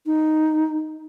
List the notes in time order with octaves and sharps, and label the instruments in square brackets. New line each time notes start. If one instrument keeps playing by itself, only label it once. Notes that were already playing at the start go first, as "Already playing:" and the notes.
[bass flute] D#4